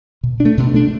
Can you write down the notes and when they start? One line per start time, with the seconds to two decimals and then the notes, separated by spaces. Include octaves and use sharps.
0.23 B2
0.40 D4
0.45 A3
0.57 B2
0.74 A3 D4